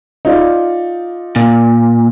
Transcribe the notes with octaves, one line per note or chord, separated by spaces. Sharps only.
D#4 F4 D5
A#2